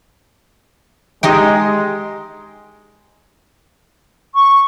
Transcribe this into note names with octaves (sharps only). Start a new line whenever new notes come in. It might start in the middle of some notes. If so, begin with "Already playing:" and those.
G#3 D#4 G4 G5
C#6